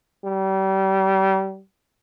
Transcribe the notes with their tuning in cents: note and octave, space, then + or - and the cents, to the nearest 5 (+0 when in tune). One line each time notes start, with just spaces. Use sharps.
G3 -30